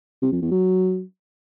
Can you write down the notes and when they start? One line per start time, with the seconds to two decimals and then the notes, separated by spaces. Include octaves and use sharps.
0.22 C3
0.32 F2
0.42 E2
0.51 F#3